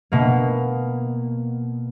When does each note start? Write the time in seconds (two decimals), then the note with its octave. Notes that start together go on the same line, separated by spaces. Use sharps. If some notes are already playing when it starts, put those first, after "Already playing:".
0.12 B2 A#3